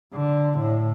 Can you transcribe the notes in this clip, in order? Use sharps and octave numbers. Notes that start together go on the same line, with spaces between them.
D3
A2